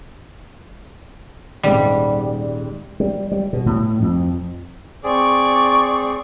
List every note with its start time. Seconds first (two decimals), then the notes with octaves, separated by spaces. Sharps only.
1.63 D#1 G#2 G3
3.00 G3
3.32 G3
3.53 B2
3.66 A2
4.02 F2
5.04 C4 G#4 D5 C#6